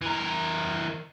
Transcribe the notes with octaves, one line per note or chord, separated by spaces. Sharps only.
E3 A#4